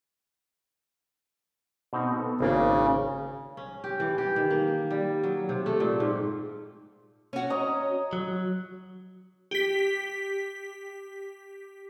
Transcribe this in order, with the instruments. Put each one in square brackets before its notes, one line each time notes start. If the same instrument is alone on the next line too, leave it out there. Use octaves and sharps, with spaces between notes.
[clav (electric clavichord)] B2 C4 D#4
B3 A4
[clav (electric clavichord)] G#1 A#3 D4 [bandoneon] C#3
[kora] C#4
G4
E3
G4
D#3
A#3
G3
F#3
C3
A3
A#2
G#2
[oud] C#4 F#4
[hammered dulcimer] C#5 D#5 A#5
[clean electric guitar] F#3
[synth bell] G4 B6